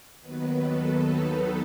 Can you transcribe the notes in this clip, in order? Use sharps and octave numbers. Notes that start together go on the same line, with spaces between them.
D#2 D#3 F#3 B3 B4
A4
D#4